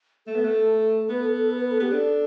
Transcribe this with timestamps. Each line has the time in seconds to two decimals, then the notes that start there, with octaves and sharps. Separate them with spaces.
0.27 A3 A4
0.36 B3
0.45 A3
1.09 B3 B4
1.23 A4
1.37 A4
1.51 B4
1.61 B4
1.71 A4
1.80 B3 G4
1.91 D4 A4